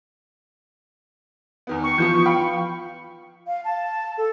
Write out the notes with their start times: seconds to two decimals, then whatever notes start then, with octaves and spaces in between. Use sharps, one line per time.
1.67 E2 D#3 B3
1.83 C#6
1.98 E3 F3 B3 G6
2.26 F5 G5 B5
3.47 F5
3.65 A5
4.18 A4